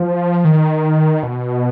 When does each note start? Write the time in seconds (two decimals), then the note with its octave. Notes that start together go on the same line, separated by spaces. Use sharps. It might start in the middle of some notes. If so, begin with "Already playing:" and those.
Already playing: F3
0.45 D#3
1.23 B2